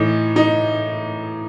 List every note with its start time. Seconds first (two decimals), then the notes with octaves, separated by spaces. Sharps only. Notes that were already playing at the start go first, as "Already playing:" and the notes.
Already playing: A2 E3 D#4
0.36 D#4